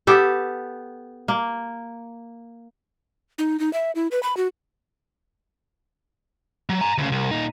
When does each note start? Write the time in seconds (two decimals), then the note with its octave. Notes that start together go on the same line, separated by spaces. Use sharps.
0.07 B3 G4 A4
1.28 A#3
3.38 D#4
3.59 D#4
3.73 E5
3.95 E4
4.11 B4
4.23 B5
4.37 F#4
6.69 F#3
6.81 G#5 A#5
6.98 D2 C#3
7.12 C2
7.31 A#2 D#4